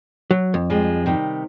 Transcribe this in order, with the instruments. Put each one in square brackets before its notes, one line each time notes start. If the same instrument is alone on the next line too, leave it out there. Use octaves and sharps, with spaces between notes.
[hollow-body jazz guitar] F#3
F2
[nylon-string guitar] F3 G3 G#3
C3 D#3 G3